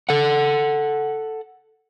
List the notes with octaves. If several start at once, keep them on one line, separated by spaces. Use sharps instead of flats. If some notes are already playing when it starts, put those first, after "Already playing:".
A4 F#5